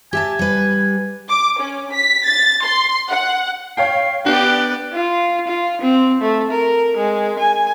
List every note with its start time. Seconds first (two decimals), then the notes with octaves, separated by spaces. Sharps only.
0.13 G4 E5 G#5 A5
0.39 G3 B4
1.29 D6
1.59 C#4
1.93 B6
2.26 A6
2.64 C6
3.09 F#5
3.77 C#5 F5 G5 C7
4.26 B3 D4 G4 D5 F#6
4.93 F4
5.48 F4
5.81 C4
6.21 A3
6.51 A#4
6.97 G#3
7.39 G#5